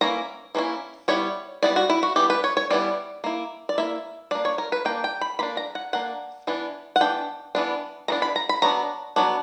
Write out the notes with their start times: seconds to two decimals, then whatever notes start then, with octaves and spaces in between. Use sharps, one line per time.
0.01 E3 A#3 C#4 E4 A#5
0.55 E3 A#3 C#4 E4
1.08 G3 B3 E4 C#5
1.63 G3 B3 E4 D5
1.76 F#4
1.90 E4
2.03 F#4
2.16 E3 G3 B3 E4 G4
2.30 B4
2.44 C#5
2.57 C#5
2.70 E3 G3 B3 E4 D5
3.24 A#3 E4
3.69 D5
3.78 A#3 E4 E5
4.31 A#3 D4 D5
4.45 C#5
4.58 A#4
4.72 B4
4.85 A#3 D4 G5
5.04 G5
5.21 B5
5.39 A#3 D4 B5
5.57 A#5
5.75 F#5
5.93 A#3 D4 F#5
6.47 E3 B3 D4
6.96 F#5
7.01 E3 B3 D4 G5
7.55 E3 B3 D4
8.08 E3 B3 D4 A#5
8.22 B5
8.36 A#5
8.49 B5
8.62 F#3 B3 D4 A#5
9.16 F#3 B3 D4